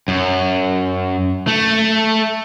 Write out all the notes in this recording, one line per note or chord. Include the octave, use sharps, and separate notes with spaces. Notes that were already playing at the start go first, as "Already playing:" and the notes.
F#2
A3